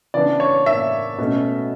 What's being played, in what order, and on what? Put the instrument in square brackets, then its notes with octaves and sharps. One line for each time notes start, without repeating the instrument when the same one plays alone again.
[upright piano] C#3 E3 B3 D4 D5
C#5
E5
B2 A3 C#4